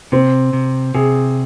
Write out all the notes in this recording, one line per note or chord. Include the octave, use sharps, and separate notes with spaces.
C3 C4
C3
C3 G#4